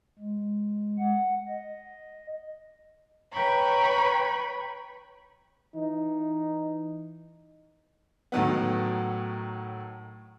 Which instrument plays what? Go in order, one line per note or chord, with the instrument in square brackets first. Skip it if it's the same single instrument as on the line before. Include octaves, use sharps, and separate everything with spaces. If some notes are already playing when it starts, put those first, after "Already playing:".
[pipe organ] G#3
F#5
D#5
[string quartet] B4 C#5 G5 A#5 B5 C#6
[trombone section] E3 D#4
[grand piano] A2 D#3 F#3 B3